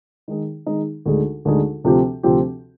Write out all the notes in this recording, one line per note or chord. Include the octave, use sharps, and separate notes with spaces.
D#3 G#3 D#4 G#4
D#3 G#3 D#4 G#4
D2 D3 G#3 D#4 G#4
D2 D3 G#3 D#4 G#4
D2 C3 F3 C4 G4
D2 C3 F3 C4 G4